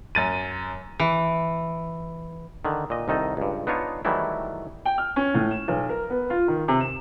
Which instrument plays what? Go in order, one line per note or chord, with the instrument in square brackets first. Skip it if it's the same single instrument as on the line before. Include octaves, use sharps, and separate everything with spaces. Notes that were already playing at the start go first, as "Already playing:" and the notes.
[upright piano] F#2 A6 D#7
[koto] E3
[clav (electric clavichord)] D3 D#3
A#2 D#5
C2 D#3 D#4 A4
C#2 G2
B3 D4 D#4 F4 C#5
D#3 E3 F#3 G3 A3 E4
[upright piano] G5
F6
C#4
A2
E7
B1
A#4
B3
F4
D#3
C3
E7